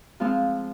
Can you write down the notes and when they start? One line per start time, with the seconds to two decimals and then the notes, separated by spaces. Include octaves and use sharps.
0.20 F3 G#3 C4 F4